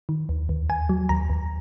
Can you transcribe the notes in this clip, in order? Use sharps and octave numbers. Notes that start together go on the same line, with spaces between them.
D#3
D#2
D#2
D#2 G#5
F#3
D#2 A#5
D#2